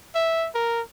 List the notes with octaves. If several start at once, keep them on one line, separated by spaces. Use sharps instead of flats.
E5
A#4